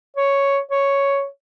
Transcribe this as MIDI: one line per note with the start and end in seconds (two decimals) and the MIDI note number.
0.17 0.58 73
0.71 1.25 73